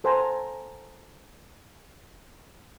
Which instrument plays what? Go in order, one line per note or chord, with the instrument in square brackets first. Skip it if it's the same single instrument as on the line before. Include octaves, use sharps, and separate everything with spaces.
[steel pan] A4 C5 F#5 G#5 A#5